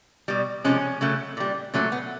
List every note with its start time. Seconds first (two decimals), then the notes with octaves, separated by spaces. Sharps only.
0.28 B2 G3
0.64 C3 F3 G#3 C#4
1.01 C#3 F#3 A3
1.37 A#2 G3
1.74 A#2 F#3 A3 C#4
1.92 B3